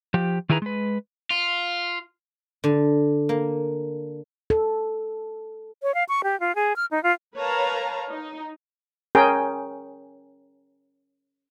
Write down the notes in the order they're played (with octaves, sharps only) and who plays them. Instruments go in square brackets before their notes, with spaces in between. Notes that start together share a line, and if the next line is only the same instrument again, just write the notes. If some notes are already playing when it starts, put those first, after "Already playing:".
[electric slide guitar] F3 G4
D#3 E4 G#4 B4 A#5
G#3 B4
[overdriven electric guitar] F4
[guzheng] D3
A#3
[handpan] A4
[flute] C#5
F5
C#6
G4
F4
G#4
F6
D#4
F4
[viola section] A#4 B4 C#5 F5 A5 A#5
D#4
[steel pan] C#4 G#4 A#4 G5